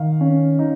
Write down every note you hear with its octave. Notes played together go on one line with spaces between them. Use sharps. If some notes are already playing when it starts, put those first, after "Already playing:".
Already playing: D#3 F5
C#4
D#4